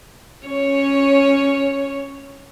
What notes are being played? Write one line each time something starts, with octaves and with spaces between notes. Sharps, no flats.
C#4 C#5